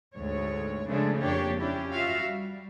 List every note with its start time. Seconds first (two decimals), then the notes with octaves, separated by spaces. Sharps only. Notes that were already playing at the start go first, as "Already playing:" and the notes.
0.15 D2 G#2 C#5
0.89 C#3 F3 G#3 A3 D4
1.19 F2 A#3 D4 G4 C#5
1.60 C#4 D4 E4 G4
1.91 F4 F#4 E5 F5
2.23 G3